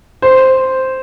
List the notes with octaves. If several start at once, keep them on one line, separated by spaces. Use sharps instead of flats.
C5